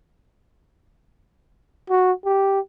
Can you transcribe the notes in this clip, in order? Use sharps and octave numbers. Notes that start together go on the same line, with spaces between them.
F#4
G4